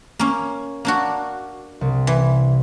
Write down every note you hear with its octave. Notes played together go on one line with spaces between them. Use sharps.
A#3 C#4
A#3 D4 F#4
C2
E3